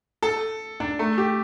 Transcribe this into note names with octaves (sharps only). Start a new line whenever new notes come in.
A4
D4
A3
G4